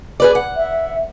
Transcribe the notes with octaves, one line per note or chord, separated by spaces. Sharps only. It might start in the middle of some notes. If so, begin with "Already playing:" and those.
G#4 B4 D5
F#5
E5